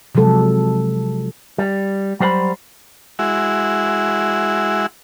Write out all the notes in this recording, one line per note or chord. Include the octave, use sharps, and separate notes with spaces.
C3 F3 F#3 G#3 A4
G3
F#3 G3 C5 F#5 B5
G#3 E4 F#4